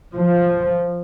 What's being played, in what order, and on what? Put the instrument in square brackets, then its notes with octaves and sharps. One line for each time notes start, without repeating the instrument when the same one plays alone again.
[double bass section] F3